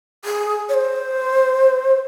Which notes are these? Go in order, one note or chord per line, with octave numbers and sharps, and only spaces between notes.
G#4
C#5
C5